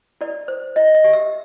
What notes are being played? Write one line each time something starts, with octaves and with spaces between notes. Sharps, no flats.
E4 D5
C5
E4 D#5
D#5
G4
E5